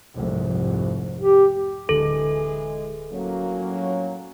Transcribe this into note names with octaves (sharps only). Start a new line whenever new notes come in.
F1 C2 G#2
G4
D1 D3 E3 G#3 A4
F2 A2 F#3 A#3 C#4